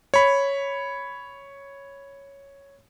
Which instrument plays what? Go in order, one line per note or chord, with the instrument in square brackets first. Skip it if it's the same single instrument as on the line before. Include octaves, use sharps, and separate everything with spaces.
[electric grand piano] C#5 B5